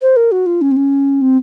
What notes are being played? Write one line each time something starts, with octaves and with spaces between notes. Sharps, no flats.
C5
A#4
F#4
F4
C#4
C4
C#4
C4